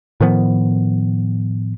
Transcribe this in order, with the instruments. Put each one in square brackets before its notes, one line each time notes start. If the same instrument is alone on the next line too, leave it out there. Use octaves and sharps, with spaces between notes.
[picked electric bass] A2 D#3 F3 B3